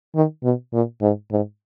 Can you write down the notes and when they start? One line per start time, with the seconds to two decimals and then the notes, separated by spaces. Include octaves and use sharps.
0.15 D#3
0.43 B2
0.73 A#2
1.02 G#2
1.31 G#2